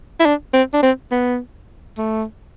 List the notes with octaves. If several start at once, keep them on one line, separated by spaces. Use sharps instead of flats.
E4
D4
C4
D4
C4
B3
A3